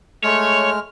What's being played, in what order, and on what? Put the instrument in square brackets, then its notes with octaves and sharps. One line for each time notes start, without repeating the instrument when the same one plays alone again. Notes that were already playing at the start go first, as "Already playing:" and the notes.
[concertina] G#3 F6 [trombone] A3 [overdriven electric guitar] C#5